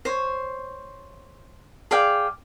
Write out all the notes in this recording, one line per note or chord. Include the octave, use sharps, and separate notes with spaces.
C5 C#5
G#4 D5 F5 G5